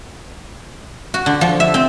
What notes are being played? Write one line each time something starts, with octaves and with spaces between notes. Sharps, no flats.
F#4
D3
F3
E5
C4